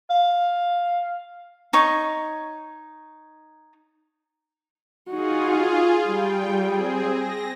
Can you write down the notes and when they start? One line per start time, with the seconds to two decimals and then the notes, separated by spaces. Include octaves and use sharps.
0.10 F5
1.73 D#4 C#5 C#6
5.10 D#4 F4 F#4 G#4
6.08 G3 G5
6.63 C4 G#4
7.11 A#6